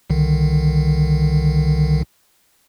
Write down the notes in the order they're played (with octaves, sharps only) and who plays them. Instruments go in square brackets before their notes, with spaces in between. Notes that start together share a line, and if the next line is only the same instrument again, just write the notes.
[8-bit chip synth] C2 D3 D#3